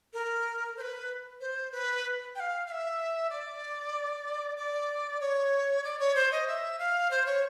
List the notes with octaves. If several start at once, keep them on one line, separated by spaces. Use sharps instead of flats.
A#4
C5
B4
C5
B4
G5
F5
F5
E5
D5
D5
C#5
D5
C#5
C5
D#5
E5
F5
C5
C#5